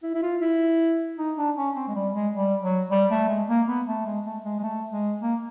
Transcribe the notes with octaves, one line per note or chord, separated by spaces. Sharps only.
E4
E4
F4
E4
D#4
D4
C#4
C4
G#3
G3
G#3
G3
F#3
G3
A3
G#3
A#3
B3
A3
G#3
A3
G#3
G#3
A3
G#3
A#3